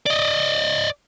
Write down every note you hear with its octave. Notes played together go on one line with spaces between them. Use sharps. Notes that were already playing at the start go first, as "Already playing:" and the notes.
D5 D#5